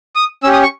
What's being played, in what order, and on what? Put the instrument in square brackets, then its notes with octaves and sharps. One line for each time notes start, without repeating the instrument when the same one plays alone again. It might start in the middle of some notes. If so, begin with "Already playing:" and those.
[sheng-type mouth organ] D#6
C#4 G4 E6
D#6
C#6